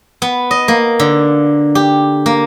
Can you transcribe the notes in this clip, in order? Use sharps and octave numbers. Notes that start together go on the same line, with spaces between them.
B3
D#5
A#3
D3
G4
A#3